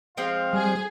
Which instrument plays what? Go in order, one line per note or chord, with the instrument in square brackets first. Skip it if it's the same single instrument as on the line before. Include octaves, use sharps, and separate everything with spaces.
[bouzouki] F3 G#3 C4 [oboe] F5
[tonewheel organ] G3 [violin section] G#4 G#5